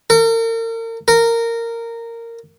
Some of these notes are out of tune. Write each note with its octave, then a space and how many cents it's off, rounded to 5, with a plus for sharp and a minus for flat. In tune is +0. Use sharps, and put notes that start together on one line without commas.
A#4 -40
A#4 -15